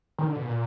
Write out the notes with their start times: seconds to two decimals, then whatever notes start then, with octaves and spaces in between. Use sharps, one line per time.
0.18 D#3
0.27 D3
0.36 B2
0.45 A#2